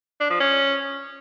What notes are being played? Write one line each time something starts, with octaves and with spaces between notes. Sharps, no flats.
D4
F3
C#4